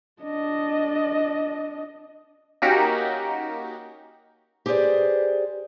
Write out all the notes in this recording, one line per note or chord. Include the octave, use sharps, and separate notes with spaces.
D4 D#5
A#3 C#4 D#4 F#4 G4 A#4
G4 G#4 B4 C5 D5